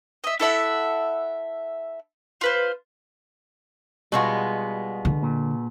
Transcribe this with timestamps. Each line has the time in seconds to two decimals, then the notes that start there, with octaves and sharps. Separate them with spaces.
0.24 D#5 E5
0.40 E4 A4 E5 F#5
2.41 F4 B4 C5
4.12 B2 G3 G#3 B3 F4
5.05 D3
5.22 A#2